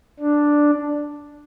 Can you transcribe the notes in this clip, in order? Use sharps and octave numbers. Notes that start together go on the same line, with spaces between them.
D4